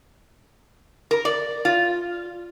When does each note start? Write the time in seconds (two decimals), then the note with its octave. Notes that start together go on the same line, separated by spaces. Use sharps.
1.11 A#4
1.25 D5
1.65 F4